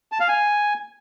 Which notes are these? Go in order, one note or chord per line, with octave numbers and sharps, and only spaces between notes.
A5
F5
G#5